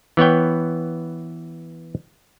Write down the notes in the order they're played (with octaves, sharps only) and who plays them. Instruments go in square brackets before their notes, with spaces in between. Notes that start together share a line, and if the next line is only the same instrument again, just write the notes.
[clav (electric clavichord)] E3 B3 C#5 G5